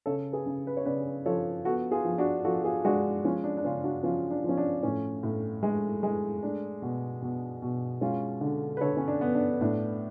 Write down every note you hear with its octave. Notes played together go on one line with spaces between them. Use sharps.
C#3 A4 C#5
G#4 B4
C#3
B4
C#5
C#3 B4 D5
F3 A4 C#5
B3 F#4 A4
F4 G#4
F3
D4 F#4
F3 F#4 A4
F4 G#4
G#3 D4 F#4
F3 C#4 F4
D4
D4
C#3 C#4 F4
D4 F#4
F3 C#4 F4
D4
F3 C#4
D4
A2 C#4
A2
G#3
G#3
A3 D4
B2
B2
B2
G#3 C#4 F4
D3
B4
D3 A4 C#5
C#4
D4
B3
D4
A2 D4